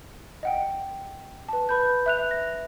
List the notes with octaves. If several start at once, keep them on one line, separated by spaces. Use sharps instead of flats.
D#5 F#5 G5
B4 A5
B4 B5 G6
E5 F#6 F7
A#6